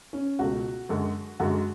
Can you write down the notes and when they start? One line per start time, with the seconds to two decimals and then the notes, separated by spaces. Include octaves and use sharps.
0.13 C#4
0.39 C#2 B2 A3 F#4
0.89 F#2 D3 G#3
1.40 F#2 D3 G#3 F#4